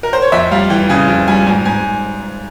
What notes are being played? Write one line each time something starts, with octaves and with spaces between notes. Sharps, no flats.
A#4
C5
C#5
F2 E5
G3 F5
E3 G5
C#3 G#5
F2
G3 G#5
G#2 G#5
G#2 G#5